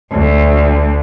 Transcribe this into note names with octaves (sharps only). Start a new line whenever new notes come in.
D2